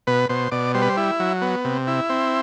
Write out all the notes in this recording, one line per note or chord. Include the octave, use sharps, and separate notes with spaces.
B2 B4
B2 C5
B2 D5
G3 C5
B4
C5
E4
F#3
B3
C3
E4
C4